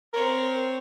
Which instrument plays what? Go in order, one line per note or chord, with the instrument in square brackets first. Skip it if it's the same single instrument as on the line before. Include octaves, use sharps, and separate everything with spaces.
[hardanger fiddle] C4 C#5 [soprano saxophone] A#4